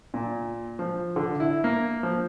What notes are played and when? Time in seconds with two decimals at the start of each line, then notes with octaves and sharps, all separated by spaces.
0.14 A#2
0.79 F3
1.16 D3
1.40 E4
1.64 A#3
2.03 F3